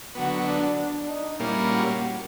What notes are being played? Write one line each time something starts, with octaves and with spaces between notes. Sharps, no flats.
D3 F#3 B3 F#4
D4
D4
D#4
A#2 G3 A#3 C#4 E4
F#4